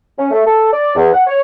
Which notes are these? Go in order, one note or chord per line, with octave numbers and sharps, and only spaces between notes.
C#4
A3
A4
D5
E2
F#5
C#5